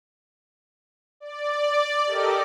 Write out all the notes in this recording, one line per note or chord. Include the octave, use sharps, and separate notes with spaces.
D5
G4 A4 A#4 D#5 D6